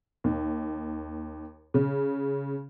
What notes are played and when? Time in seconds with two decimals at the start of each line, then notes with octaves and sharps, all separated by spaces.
0.24 D#2
1.74 C#3